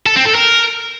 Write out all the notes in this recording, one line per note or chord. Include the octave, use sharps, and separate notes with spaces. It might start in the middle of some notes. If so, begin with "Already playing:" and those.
A4
C4
A4
A#4